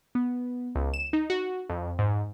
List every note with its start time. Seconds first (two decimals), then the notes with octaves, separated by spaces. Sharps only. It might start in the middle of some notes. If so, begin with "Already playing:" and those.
0.15 B3
0.75 C#2
0.94 E7
1.13 D#4
1.30 F#4
1.69 F2
1.99 G#2